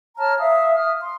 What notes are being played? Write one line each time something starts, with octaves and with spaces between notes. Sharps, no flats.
C#5 A5 A#5 F6
E5 F5 D#6
D#6 F6
C6